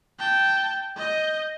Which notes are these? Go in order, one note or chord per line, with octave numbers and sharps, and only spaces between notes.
G5 A5
D#5 G6